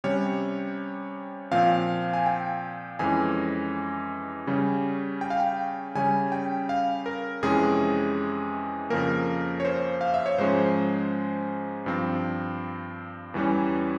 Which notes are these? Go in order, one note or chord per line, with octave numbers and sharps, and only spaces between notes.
C3 G3 C#4 C#5
A#2 F3 C4 F5
G#5
G5
F2 E3 G#3 C#4 G#5
C#3 G3 C#4
G5
F5
G5
C#3 G3 C#4 G#5
G5
F5
A#4
F2 C3 E3 G#3 C#4 G#4
F2 C#3 F3 A#3 A#4
C#5
C5
F5
E5
C#5
G#2 F3 G#3 C#4 C5
G2 F3 C4
E2 E3 G3 C#4